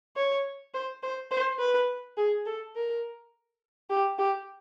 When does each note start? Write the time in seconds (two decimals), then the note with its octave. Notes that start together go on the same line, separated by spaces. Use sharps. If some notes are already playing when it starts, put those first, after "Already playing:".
0.16 C#5
0.74 C5
1.03 C5
1.31 C5
1.59 B4
2.17 G#4
2.46 A4
2.76 A#4
3.90 G4
4.19 G4